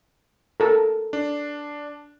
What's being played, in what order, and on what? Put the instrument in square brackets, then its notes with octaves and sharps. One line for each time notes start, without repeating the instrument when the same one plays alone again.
[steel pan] A4 A#4
[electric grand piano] D4